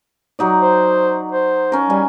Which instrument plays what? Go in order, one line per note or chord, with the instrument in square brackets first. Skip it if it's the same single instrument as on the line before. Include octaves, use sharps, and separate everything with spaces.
[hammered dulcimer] F#3 D#4 D5
[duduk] C5
C5
[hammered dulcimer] C#4 A#4
[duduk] G3 [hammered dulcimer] G#5